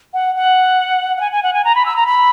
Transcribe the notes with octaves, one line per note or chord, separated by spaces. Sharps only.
F#5
F#5
F#5
G#5
G#5
F#5
G#5
A#5
B5
E6
A#5
B5